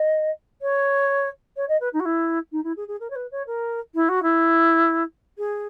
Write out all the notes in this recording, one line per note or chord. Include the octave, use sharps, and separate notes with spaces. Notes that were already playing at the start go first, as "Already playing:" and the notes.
Already playing: D#5
C#5
C#5
D#5
B4
D#4
F#4
E4
D#4
E4
G#4
G#4
A#4
C#5
B4
C#5
A#4
E4
F#4
E4
G#4